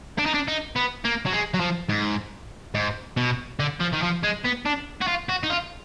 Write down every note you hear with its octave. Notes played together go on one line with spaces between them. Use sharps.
D4
D#4
D4
D#4
B3
A#3
F#3
G#3
F#3
F3
G#2
G#2
B2
D3
F3
D#3
F3
G#3
B3
D4
F#4
F4
F#4
D#4
F4